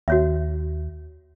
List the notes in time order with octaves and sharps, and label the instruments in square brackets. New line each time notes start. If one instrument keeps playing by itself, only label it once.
[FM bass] D#2 [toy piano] F#4 C#5 E5